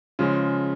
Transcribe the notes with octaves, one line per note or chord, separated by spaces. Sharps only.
C#3 F3 G#3 C#4